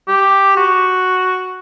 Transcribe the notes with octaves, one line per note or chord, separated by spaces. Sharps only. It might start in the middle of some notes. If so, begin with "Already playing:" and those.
G4
F#4